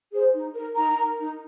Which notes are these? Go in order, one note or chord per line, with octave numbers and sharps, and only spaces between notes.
G#4 C5
D#4
A#4
D#4 A#5
A#4
D#4